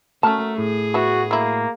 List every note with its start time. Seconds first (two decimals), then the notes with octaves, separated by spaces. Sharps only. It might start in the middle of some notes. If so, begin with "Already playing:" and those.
0.23 A3 C#4 F#4 A#4 A5
0.58 A2 G#4
0.94 B3 E4 F#4
1.31 F#3 A#3 E4